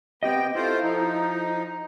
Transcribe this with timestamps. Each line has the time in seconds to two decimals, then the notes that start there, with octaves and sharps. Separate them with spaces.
0.23 B3 C4 G4 D#5 G5
0.55 A3 E4 F4 C5
0.82 F3 D#4